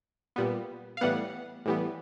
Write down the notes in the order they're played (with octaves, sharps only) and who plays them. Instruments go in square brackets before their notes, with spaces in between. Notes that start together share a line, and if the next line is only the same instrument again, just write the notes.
[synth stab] A#2 G3 B3
F5
A2 E3 G3 B3 F#5
A2 E3 G3 B3